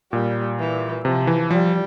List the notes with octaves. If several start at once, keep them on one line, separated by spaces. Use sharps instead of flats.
A#2 G3
E3
C3 F3
E3
F3 G3